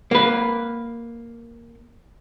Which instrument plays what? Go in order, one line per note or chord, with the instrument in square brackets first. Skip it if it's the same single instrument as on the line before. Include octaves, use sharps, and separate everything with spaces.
[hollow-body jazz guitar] A#3 B4